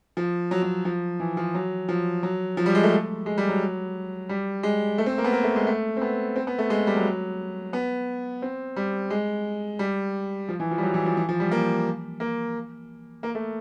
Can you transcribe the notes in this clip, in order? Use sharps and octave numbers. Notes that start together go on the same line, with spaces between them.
F3
F#3
F#3
F3
E3
F3
F#3
F3
F#3
F3
G3
G#3
A3
G#3
G3
F#3
G3
G#3
A3
C4
A#3
B3
A#3
A3
G#3
A3
C4
B3
C4
B3
A3
G#3
G3
F#3
B3
C4
G3
G#3
G3
F3
E3
F3
G3
F#3
E3
F3
E3
F3
G3
A#3
A#3
A#3
A3